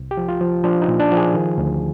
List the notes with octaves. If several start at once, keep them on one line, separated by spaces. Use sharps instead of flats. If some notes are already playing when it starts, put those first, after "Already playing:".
Already playing: C2
G4
F3
F4
F3
F3 D4
D#4
A#2
D4
F3
G#4
D#3
D2